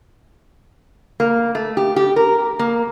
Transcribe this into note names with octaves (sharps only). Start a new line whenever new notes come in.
A#3
A3
G4
G4
A#4
A#3